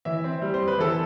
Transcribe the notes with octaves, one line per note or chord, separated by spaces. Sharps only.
E3 E5
C4
G3
C5
F2
B4
E3 A4